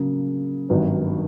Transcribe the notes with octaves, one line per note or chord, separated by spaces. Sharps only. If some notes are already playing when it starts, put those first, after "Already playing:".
Already playing: C#3 F#3 A#3
G#1 G2 D#3 F#3 B3